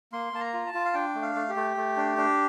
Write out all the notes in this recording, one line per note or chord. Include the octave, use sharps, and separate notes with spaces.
A#3 C6
A#3 A5
A#5
F4
A5
F4
F5
D4 G5
A3
F5
A3
G4
A3
A3
D4
D4